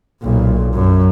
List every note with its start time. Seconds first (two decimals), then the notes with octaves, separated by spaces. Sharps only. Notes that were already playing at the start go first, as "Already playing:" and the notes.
0.23 B1 A#2
0.74 F#2